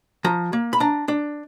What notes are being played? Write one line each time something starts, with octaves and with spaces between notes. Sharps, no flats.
F3 A#5
A#3
B5
D4 A#5
D4